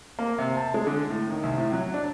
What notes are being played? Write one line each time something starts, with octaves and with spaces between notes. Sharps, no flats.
A#3
C3
A5
G#3
D3
A2
D#3
C2
A2
F#3
D4